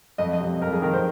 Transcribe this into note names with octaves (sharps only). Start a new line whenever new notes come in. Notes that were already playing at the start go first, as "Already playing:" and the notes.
F2 D#5
D#5
C3
F2 A#4
G#4
D#3 A#4
C5